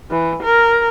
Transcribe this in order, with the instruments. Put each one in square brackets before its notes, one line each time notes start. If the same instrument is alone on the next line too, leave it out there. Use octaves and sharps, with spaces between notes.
[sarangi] E3
A#4